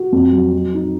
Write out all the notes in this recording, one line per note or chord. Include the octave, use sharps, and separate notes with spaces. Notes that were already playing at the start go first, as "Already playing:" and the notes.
Already playing: F#4
F2
F#3
F#3
D#4